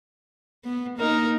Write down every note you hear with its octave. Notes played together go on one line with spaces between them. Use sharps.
B3
A#3 D#4 A#4